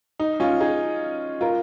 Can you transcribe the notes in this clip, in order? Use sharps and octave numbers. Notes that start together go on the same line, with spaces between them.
D#4
C#4 F4
D#4 G#4
F4 A#4